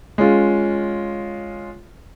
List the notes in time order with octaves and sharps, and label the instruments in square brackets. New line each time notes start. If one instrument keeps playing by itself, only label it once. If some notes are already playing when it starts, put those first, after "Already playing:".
[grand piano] G#3 C#4 F4